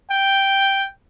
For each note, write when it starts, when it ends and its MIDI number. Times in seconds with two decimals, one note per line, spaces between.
0.10 0.88 79